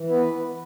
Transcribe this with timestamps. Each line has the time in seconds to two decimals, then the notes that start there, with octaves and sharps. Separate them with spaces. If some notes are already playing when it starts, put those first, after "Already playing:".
Already playing: E3
0.09 B3 B4